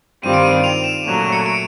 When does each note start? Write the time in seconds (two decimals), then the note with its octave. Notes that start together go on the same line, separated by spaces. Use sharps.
0.23 G2 D#3 G3 C4 F4 D#7
0.34 D7
0.44 D#7
0.64 F7
0.84 E7
1.04 A#2 F#3 A3 C#4 E7
1.18 D#7
1.32 C#7
1.46 D7